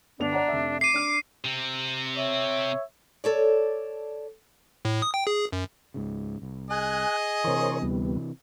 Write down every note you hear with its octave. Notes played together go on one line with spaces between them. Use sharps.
G1 B3 D4 F7
D5 F#5 A#5
F1 E5
D6 C7 D#7
D4 F6
C3 C4
C#5 E5
A4 C#5 D5
A2
D#6
G5
G#4
F#2
C#2 G#2 C#3
C2
G#4 D#5 G#5 F#6
C3 E3 A#4 C5 C#5
D2 G3 B3